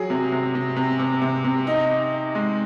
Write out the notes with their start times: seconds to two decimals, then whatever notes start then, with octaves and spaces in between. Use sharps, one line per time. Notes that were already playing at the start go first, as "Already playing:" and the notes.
Already playing: F#3 G#4
0.10 C3
0.32 C3
0.55 C3
0.76 C3
0.99 C3
1.22 C3
1.44 C3
1.67 D#4
1.90 D#4
2.13 D#4
2.35 G#3